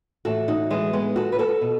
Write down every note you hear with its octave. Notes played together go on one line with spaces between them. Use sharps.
A2 E3 F#4 A4
D#4 F#4
E3 G#3
G#3 B3
F#4 A4
B4
F#4 A4
B2